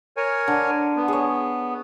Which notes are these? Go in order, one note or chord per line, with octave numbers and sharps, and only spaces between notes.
A#4 C#5 G#5
D3
B3
G#4 C#5